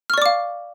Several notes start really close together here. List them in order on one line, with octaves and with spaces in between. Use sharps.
F6 C#6 D5 D6 F5